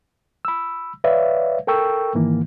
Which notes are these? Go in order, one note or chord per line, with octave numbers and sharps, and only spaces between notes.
B5 E6
B4 C#5 D5 E5 F5
A4 A#4 G5 C#6 E6
G#2 D#3 E3 A#3